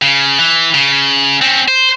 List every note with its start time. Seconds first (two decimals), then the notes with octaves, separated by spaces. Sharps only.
0.02 C#3
0.39 E3
0.74 C#3
1.42 C4 C#4
1.68 C5